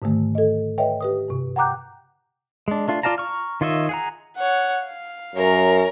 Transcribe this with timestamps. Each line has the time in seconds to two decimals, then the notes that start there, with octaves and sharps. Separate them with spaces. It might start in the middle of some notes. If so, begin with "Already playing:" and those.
0.02 G#2 D3 D#3 A3
0.35 A4 D#5
0.78 B4 C#5 D#5 E5 G5
1.01 G4 B4 D#6
1.28 G2 C3
1.56 F#5 G5 A#5 D6 F#6 G6
2.68 G#3 D4
2.88 A3 D4 F4
3.03 F4 D5 F5 A5 A#5
3.18 A#5 C#6 F6
3.61 D#3 F4 C#5 D#5 E5
3.89 G#4 F#5 A#5
4.37 C#5 F#5
4.86 F5
5.35 F#2 A#4 C#5